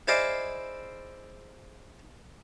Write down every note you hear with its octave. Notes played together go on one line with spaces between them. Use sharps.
E4 G#4 C5 D5 D#5 F5